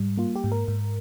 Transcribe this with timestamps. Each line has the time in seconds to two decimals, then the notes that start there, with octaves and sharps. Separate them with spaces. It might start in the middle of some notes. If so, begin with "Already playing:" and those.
Already playing: G#2 G3
0.18 A#3 F4
0.36 G4
0.44 G#2
0.52 A#4
0.68 G#2